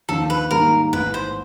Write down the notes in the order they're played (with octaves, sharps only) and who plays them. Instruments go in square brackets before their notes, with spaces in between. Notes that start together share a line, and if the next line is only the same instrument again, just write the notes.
[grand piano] D#2 D3 F3 [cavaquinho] A4
[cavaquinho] B4
[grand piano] G#2 D#3 G3 A#3 [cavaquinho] A#4
[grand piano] A1 G#2 E3 [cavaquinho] B4
[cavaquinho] C5